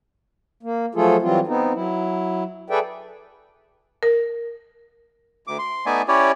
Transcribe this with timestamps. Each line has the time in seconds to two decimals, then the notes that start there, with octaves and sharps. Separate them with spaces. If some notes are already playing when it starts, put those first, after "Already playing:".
0.63 A#3
0.95 F3 F#3 A3 F4 G#4 A4
1.22 E3 F#3 G3 C4 F4
1.47 B3 C4 D#4
1.73 F#3 E4
2.70 G#4 A4 B4 D5 E5 G5
4.03 A#4
5.47 D2 D6
5.59 C6
5.86 A3 B3 D#4 D5 E5 G#5
6.08 C#4 E4 G4 C#5 D5